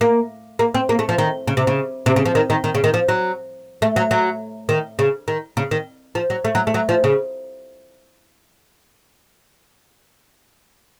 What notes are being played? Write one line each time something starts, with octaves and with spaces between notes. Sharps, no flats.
A#3
A#3
C4
A#3
A3
F3
D#3
C#3
C3
C#3
C3
C#3
F3
D#3
D#3
D#3
C#3
D#3
F3
F#3
A3
F#3
F#3
D#3
C#3
D#3
C#3
D#3
F3
F#3
A3
F#3
A3
F#3
F3
C#3